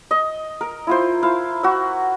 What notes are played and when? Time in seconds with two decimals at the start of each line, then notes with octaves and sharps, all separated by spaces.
0.11 D#5
0.61 A#4
0.87 E4 F4 C5
1.23 E4 F5
1.63 F#4 E5